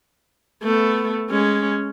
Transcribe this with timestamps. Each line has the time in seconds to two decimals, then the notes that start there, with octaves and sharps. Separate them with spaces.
0.63 A3 B3
1.30 G#3 C#4